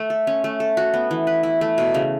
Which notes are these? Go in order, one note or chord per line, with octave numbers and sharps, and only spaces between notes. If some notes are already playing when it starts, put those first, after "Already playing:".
Already playing: A3
A4
C#4
A3
A4
F#4
B3
E3
B4
E4
A3
B2
C#3